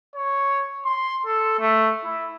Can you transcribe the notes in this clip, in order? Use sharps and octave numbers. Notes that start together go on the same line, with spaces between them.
C#5
C6
A4
A3
E4